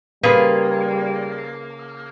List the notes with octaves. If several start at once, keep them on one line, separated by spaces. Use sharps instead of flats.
C#3 G3 A#3 F4 G#4 B4